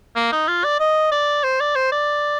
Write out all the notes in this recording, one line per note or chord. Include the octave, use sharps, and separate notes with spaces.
A#3
D#4
F4
D5
D#5
D5
C5
D5
C5
D5